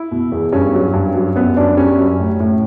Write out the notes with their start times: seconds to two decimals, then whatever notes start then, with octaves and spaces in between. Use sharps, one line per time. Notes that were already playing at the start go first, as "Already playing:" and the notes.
Already playing: E4
0.11 B2
0.32 E2
0.52 G2 C#4
0.73 F#3
0.94 G2
1.15 F#3
1.35 F#2 B3
1.57 F#2 D4
1.77 G3 C#4
1.98 F#2
2.19 A2
2.40 A2